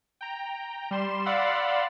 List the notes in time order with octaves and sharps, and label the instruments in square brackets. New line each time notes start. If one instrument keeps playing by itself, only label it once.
[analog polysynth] G5 A#5
G3 C6 E7
D5 F5 F#5 B5 C6 E6